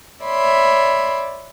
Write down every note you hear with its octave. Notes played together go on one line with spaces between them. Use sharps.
C#5 D5 E5 B5 C6